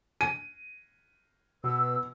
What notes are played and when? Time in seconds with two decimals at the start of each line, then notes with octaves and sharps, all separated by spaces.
0.21 D#7
1.64 B2 B4 E6